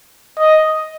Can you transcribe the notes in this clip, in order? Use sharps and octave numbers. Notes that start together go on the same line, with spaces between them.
D#5